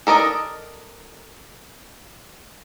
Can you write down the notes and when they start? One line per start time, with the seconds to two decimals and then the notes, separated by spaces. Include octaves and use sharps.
0.07 A4 A#4 D5 D#5